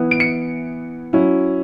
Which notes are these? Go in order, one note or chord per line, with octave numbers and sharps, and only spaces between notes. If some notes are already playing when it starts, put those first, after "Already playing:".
Already playing: E3 B3 E4
D7
C#7
F#3 C#4 E4